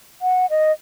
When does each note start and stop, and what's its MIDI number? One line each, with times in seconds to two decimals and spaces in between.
0.22 0.46 78
0.50 0.72 75